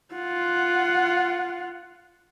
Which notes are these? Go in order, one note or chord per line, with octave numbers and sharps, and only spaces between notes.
F4 F#5